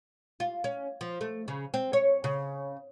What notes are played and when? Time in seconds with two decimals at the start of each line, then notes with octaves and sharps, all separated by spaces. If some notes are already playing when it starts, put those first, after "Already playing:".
0.40 F4
0.64 C#4
1.01 F3
1.21 A3
1.48 C#3
1.74 C4
1.93 C#5
2.24 C#3